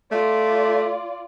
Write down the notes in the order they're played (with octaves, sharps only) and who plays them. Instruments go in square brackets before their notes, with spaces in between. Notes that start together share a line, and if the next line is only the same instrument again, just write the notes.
[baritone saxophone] A3 [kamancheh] F4 D5